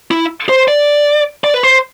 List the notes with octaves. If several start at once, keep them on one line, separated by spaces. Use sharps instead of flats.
E4
C5
D5
D5
B4
C5